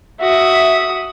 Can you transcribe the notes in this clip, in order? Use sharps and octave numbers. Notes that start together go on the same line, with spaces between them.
F#4 E5 D#6